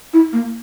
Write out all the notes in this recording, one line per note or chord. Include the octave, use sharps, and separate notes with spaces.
E4
A#3